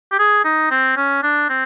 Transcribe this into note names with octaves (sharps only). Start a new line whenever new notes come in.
G4
G#4
D#4
C4
C#4
D4
C4